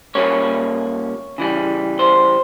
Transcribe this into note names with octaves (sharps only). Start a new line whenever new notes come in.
A#2 G3 A#3 C#4 C#5
C#3 E3 G3
C5